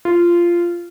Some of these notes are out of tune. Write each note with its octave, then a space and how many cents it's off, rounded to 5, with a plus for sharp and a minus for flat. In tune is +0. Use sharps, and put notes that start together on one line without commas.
F4 -15